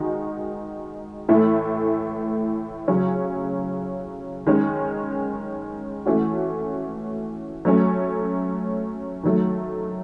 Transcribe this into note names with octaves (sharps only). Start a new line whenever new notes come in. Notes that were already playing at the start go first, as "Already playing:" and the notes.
Already playing: D#3 G#3 D#4 F#4
A2 E3 A3 E4
C#3 F#3 C#4
D#3 G#3 C#4
E3 A3 C#4 F#4
F#3 A3 C#4
D#3 F#3 A3